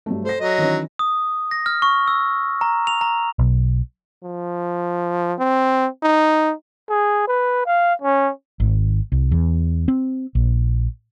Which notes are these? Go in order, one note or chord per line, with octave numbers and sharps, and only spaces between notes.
G2 F#3 A3
A4 C5 A#6
F#3 D#5
D#3 E3 C#4
D#6
A#6
F6
C#6
E6
A#5
F7
A#5
B1
F3
C4
D#4
G#4
B4
F5
C#4
G#1
C2
E2
C4
A#1